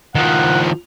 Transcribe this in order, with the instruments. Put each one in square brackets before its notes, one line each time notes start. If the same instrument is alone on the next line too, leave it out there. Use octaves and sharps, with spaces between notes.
[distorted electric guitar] D#3 F3 [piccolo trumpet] F#5